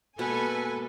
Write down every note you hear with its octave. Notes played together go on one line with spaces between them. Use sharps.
B2 G#3 A#3 A4 B4 G#5